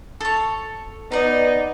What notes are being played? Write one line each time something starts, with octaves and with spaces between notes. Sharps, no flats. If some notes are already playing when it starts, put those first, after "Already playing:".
A4 C#5
B3 D#4 D5 A#5